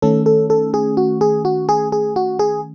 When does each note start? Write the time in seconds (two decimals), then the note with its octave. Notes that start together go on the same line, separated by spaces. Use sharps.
0.02 D#3 A3 C#4 A4
0.26 A4
0.50 A4
0.74 G#4
0.97 F#4
1.21 G#4
1.45 F#4
1.69 G#4
1.92 G#4
2.16 F#4
2.39 G#4